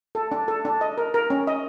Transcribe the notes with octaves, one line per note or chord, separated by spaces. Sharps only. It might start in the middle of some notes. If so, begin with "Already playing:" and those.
A4
D4
A4
D4
D#5
A#4
A#4
C#4
D#5